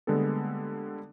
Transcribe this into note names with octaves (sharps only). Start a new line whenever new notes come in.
D3 G3 G#3 A#3 B3 A4